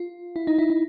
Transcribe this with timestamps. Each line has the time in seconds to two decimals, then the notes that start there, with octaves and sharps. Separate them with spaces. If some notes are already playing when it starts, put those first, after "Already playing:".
Already playing: F4
0.36 E4
0.47 D#4
0.58 E4
0.70 D#4